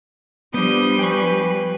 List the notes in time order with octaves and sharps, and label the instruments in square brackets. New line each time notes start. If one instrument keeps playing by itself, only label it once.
[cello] F3 G3 [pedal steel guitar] B3 D4 [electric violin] D#6 G6
[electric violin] B4 [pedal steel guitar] G5 G#5 C#6